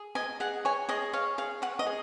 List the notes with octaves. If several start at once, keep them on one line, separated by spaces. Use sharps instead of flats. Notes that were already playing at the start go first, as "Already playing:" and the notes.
Already playing: G#4
D#5 G#5
G#4 F#5
C#5 G#5
G#4 D#5
C#5 F5
G#4 F5
C#5 F#5
D#5
G#4